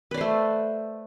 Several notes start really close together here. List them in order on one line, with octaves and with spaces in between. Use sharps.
B4 D5 C5 A3